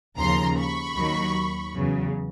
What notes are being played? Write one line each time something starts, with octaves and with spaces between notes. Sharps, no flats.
D#2 C#3 F3 A#5 C6
B5 C#6
D#2 D#3 F#3
E2 C#3 F#3